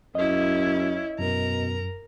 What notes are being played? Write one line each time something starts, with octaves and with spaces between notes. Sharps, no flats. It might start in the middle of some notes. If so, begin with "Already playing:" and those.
F#2 C#4 E4 D#5
F#2 B2 A#4 A#5